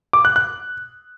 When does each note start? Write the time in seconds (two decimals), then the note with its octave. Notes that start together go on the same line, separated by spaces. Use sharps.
0.13 D6
0.25 F#6
0.36 F#6